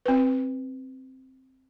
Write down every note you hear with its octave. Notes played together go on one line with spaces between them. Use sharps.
C4 B4